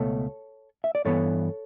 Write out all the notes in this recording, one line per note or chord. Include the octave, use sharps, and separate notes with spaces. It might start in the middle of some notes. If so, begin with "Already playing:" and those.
Already playing: C#2 B2 A3 A4 C#5
E5
D5
G2 E3 B3 A4 C#5